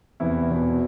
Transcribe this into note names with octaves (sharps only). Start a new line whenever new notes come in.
E2 C3 E3 E4
E2 B2